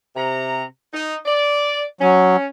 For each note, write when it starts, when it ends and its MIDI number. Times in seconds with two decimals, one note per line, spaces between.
0.16 0.63 48
0.16 0.63 82
0.93 1.16 63
1.25 1.84 74
2.01 2.37 54
2.01 2.46 61